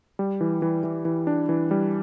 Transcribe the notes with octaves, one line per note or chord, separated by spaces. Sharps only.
G3
E3
E3
E3
E3
D4
E3
G3